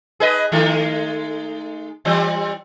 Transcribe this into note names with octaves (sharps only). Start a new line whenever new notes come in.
G#4 B4 D#5
D#3 G#3 A3
E3 G3 C4